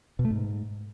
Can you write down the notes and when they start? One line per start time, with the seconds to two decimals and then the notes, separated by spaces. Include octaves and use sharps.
0.19 B2
0.25 A3
0.31 G#2